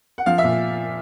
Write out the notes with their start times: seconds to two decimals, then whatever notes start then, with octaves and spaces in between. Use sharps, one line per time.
0.18 F#5
0.26 F3 F5
0.38 E5
0.43 A#2